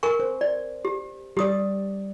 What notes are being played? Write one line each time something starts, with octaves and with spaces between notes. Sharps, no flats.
A#4 G#5 C#6
C5
D5
G4
G3 G4 D5 D#6